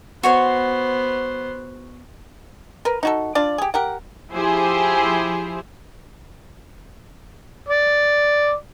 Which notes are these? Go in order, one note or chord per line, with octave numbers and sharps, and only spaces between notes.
B3 F#4 C5 C#5 C6
A#4 B4
D#4 F#4 A4
D4 F4 D5
G4 G#4
G4 A#4 F#5
F3 E4 G4 G#4 C5
D5